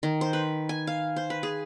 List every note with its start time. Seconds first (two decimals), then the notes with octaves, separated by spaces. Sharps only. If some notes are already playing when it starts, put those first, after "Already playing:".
0.03 D#3
0.21 C5
0.33 B4
0.69 G#5
0.87 F5
1.16 C5
1.30 B4
1.43 G#4